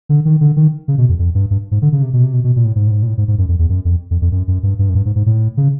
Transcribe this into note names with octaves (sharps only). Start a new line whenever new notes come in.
D3
D#3
D3
D#3
C#3
B2
F2
F2
G2
G2
G#2
D3
C#3
C3
B2
C3
B2
B2
A#2
A2
G#2
A2
G#2
A#2
A2
G#2
G#2
F#2
F2
E2
F#2
F2
F2
F2
F#2
F#2
G2
G2
F#2
G2
G#2
G#2
A2
C#3